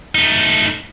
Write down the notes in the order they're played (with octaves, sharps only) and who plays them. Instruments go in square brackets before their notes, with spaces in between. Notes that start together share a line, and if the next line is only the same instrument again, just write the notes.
[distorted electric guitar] A3 D#4